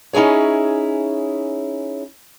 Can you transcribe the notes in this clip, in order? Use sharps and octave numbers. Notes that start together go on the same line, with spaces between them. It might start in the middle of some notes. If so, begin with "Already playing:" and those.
C#4 D#4 E4 G#4 C#5